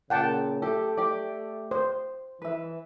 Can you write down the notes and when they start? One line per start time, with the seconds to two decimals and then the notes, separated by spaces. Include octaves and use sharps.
0.10 A#2 C#3 F#5 G5 A5
0.62 A3 G4 A4
0.97 G4 D5
1.71 C5
2.42 E3 B4 E5